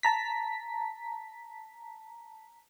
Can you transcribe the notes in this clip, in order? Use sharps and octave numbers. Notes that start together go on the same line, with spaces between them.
A5 A#5 B6